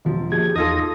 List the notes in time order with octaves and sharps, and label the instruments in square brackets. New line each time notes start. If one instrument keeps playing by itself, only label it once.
[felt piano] E1 F3
[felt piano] A#1 [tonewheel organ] G4 G#4 G#6
[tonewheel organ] E2 D#6 A#6 [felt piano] D#4 F4 A4